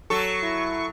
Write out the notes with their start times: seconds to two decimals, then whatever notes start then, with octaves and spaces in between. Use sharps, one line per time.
0.10 F#3 A4 C#6
0.42 E4